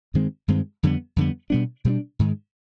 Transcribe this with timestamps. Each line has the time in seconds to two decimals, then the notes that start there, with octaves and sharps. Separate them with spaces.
0.14 G2 D#3 G#3 C4
0.48 G2 D#3 G#3 C4
0.83 F2 D3 G3 B3
1.16 F2 D3 G3 B3
1.50 B2 G3 B3 D4
1.85 B2 G3 B3 D4
2.19 G#2 D#3 G#3